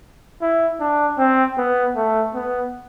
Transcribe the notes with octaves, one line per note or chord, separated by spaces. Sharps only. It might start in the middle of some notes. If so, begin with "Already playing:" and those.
E4
D4
C4
B3
A3
B3